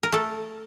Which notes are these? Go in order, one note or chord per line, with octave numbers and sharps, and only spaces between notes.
A#4
A3 A4